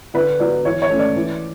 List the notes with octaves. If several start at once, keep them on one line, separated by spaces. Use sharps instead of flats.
D3 B4
F#3 B3 D5
E3 C#5
C#5
A3 C#4
D5
E3